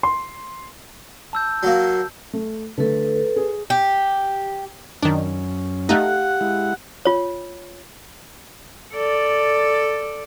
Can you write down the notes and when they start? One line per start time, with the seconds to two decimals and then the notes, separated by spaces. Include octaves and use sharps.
0.03 C6
1.33 A5 E6 G6
1.63 F#3 A#3
2.33 A3
2.78 D3 A3 A4 B4
3.36 G#4
3.70 G4
5.02 F#2 D#3 C#4 D4
5.89 A3 D#4 G4 F5 F#5 F#6
6.41 G#3 E4
7.05 F4 C#5
8.93 A4 D5